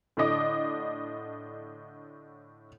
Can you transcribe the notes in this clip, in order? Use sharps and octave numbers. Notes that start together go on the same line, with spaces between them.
A2 D3 D4 D#5 D6